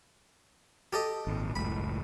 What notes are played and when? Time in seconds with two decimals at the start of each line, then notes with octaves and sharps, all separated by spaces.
0.93 G4 A4 D#5
1.27 G#1 A#2
1.56 F#1 C#2 A2 B5